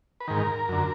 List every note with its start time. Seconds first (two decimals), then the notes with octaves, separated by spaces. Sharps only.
0.20 B4
0.28 G#2 D#3 A#4
0.69 F#2 D3